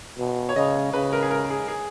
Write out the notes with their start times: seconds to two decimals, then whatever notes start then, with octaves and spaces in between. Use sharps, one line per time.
0.18 B2
0.49 C#5
0.56 C#3 D#5
0.93 C#3 B4
1.13 A#4
1.22 G#4
1.31 A#4
1.50 G#4
1.68 G#4